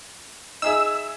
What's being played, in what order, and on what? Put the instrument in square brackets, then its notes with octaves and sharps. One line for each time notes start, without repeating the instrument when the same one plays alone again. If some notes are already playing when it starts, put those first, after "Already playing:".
[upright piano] D#4 G#4 E5 [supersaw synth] E6